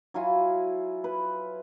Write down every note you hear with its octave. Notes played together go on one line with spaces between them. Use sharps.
F#3 E4 F4 G#5
B4